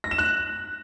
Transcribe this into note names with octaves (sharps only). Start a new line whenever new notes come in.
A#6
E7
F#6